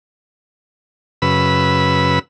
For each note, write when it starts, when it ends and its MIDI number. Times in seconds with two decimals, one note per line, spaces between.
1.22 2.19 42
1.22 2.19 49
1.22 2.19 71
1.22 2.19 83
1.22 2.19 88